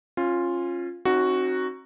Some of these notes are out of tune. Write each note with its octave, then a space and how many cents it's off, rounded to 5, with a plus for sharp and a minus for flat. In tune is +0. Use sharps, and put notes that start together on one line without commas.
C#4 -25 F4 +0
C4 +45 D#4 +0 F#4 +0